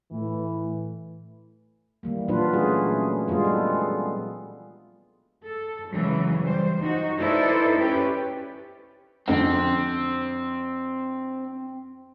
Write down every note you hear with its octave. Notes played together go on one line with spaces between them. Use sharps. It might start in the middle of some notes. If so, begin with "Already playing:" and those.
A2 E3
E3 G3 A#3
A#2 F#3 D4 F4 B4
A3 C#4 F#4 G#4
G3 G#3 B3 F4 G#4
A4
A4
C#3 E3 F#3 G#3
G3 C5
D#4 F#4
D#4 E4 A4 B4 C5 D5
C#4 G4 B4
F2 D3 C4